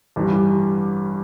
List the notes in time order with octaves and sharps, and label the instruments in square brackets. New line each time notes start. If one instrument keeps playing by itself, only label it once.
[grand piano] A1 G2 E3 G3